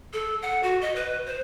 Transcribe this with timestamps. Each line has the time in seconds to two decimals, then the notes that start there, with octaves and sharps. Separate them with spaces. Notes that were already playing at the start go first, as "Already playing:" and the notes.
0.13 A4
0.42 F#5
0.63 F#4
0.81 D#5
0.96 B4
1.26 C5